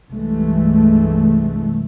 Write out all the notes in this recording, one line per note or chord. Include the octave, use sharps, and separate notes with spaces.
C2 G2 E3 G#3 A3